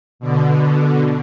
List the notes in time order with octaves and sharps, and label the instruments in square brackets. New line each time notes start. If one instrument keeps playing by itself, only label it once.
[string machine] B2 D3